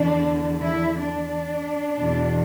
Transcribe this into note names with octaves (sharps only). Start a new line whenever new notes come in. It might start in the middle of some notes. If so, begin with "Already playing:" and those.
Already playing: E2 D3 D4
E4
D4
E2 B2